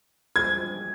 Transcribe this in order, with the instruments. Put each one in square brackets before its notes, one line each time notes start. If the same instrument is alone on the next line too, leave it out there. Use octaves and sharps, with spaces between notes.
[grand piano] G#6